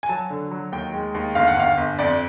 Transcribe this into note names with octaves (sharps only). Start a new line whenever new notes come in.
G#5
F#3 A5
D3
F#3
D#2 G5
G#3
D#2
G1 F5
F#5
G1 F5
G1
F2 D5